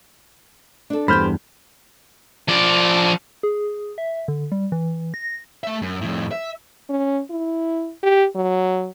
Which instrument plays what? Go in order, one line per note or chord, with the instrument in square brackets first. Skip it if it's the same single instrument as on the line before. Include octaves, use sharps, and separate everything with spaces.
[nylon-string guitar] D4 A4
[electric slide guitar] E2 G2 [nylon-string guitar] G4 C5 [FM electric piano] B5 F6 G6
[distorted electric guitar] F3 D5
[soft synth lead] G#4
E5
D3
G3
E3
A#6
[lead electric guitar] A3 E5
F#2
F2 A2
E5
[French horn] C#4
E4
G4
F#3